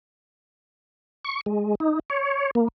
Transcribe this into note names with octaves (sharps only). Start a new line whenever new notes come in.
C#6
G#3
D#4
C#5
A#3